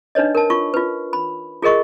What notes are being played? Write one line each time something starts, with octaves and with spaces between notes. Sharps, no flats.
D4 D#4 B4 C#5 D#5
A#4 A5
F4 C#6
F4 B4
B5
F4 G#4 A#4 D#5 C#6